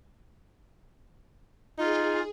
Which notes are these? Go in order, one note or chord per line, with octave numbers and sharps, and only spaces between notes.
D#4 F4 G#4